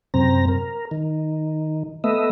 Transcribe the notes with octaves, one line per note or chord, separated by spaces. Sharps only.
F#2 C3 C4 A#5
A#4
D#3
A3 B3 D#5 E5